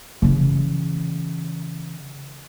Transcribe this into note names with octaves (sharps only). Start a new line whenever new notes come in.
C#3 E3